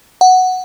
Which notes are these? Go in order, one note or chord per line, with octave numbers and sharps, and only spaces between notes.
F#5